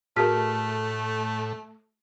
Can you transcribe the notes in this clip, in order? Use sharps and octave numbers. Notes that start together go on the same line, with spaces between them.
A2 A3 F#4 G#4 A#4 A5 F6 B6